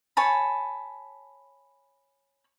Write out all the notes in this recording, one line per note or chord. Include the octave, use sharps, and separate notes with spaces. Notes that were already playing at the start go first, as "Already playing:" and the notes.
C#5 G#5 A5 B5